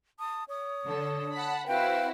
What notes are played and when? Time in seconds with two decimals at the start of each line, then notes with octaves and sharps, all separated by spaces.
0.19 A5 D#6
0.49 C#5 D#6
0.85 D3 A4
1.33 F#5 A5 B5
1.68 C4 E4 F#4 B4 F5 G5